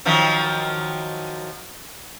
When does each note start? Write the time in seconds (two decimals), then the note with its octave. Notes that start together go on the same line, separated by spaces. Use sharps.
0.05 D#3 F3 F#3